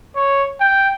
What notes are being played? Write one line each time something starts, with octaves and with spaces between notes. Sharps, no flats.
C#5
G5